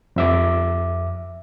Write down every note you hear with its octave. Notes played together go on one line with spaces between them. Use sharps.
F2 E5 D6